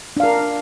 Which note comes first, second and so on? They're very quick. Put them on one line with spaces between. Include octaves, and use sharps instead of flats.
D4 F5 A#4